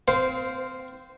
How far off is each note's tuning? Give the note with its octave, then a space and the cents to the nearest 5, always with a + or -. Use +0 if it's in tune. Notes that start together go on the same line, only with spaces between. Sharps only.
C4 -25 C5 -10 F5 +0